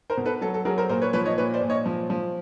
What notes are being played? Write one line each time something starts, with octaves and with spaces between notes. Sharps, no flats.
A#4 C5
B2
A4 B4
F#3 A4
A4
F#3 G#4 A#4
A#4 C5
A#2 A#4 C5
B4 C#5
F3 B4 C#5
C#5 D#5
A#2 B4 C#5
C5 D5
A#2
C#5 D#5
F3
F3